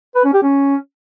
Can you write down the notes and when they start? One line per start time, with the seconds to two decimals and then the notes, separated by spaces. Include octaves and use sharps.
0.15 B4
0.25 C#4
0.34 G4
0.43 C#4